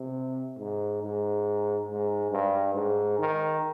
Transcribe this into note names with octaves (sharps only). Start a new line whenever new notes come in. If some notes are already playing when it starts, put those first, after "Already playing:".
Already playing: C3
G#2
G#2
G#2
G2
G#2
D#3